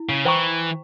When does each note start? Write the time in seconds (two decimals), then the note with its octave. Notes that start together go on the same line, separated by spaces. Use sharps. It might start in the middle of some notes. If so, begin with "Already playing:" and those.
Already playing: E4
0.09 C#3
0.25 E3 C5 G5 A#5 C#6